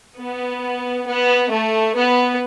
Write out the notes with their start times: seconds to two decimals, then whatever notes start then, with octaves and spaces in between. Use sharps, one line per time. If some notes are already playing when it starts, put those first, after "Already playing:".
0.18 B3
1.07 B3
1.51 A3
1.96 B3